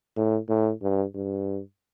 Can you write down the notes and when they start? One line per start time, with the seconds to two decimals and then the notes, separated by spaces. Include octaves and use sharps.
0.16 A2
0.49 A2
0.82 G2
1.15 G2